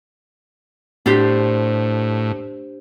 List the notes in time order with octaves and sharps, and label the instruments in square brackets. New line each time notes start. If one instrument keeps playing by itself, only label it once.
[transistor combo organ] A2 [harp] D4 G4 C5